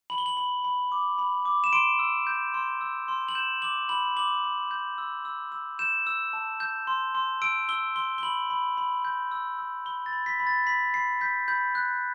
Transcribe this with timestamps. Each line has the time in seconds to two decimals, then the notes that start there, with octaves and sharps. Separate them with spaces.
0.10 B5 F#7
0.18 G7
0.26 F#7
0.37 B5
0.64 B5
0.92 D6
1.18 B5
1.45 D6
1.64 E7
1.73 C6 D7
1.99 E6
2.27 G6
2.54 C6
2.81 E6
3.08 C6
3.28 F#7
3.35 G6 E7
3.62 D6 F#7
3.89 B5 F#7
4.16 D6 F#7
4.44 B5
4.71 G6
4.98 E6
5.25 E6
5.52 E6
5.79 G6 E7
6.07 E6
6.33 A5
6.60 G6
6.87 C6
7.15 C6
7.42 E6 D7
7.69 E6 G7
7.96 C6 G7
8.18 G7
8.23 B5 F#7
8.50 B5
8.77 B5
9.05 G6
9.32 E6
9.59 E6
9.86 B5 G7
10.06 A6
10.13 B5
10.26 B6
10.40 B5
10.47 A6
10.67 B5 B6
10.94 B5 C7
11.21 G6 B6
11.48 B5 G6
11.75 F#6